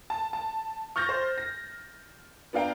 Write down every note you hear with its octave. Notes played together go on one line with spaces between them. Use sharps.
A5
A5
C#6 F6 G6 A6 A#6
C5
A#6
B3 D4 F5 G5 A#5